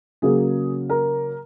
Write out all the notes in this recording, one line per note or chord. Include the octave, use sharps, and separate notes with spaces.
C#3 F#3 A#3 G#4
A#4